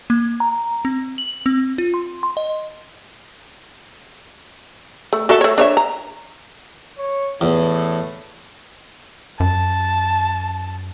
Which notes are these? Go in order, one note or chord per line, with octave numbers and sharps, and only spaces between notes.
A#3
A#5
C4
F#7
C4
F4
C6
C6
D#5
A3
F#4 A4 E5
A3 C#5
D4 C#5 E5
A#5
C#5
E2 A2
F#2 A5